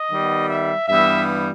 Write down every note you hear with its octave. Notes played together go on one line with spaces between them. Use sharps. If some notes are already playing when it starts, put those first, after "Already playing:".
Already playing: D#5
D#3 G3 B3
E5
G2 E3 G3 B3 E5